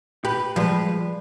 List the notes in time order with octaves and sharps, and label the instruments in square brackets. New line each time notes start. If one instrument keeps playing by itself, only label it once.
[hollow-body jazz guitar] G4 [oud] B4
[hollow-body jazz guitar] F3 G#3 B4 [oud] G3